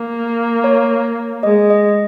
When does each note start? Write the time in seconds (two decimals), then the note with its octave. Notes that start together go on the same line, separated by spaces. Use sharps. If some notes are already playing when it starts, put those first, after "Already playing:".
Already playing: A#3
0.64 C#5
1.43 G#3 D#5
1.70 D#5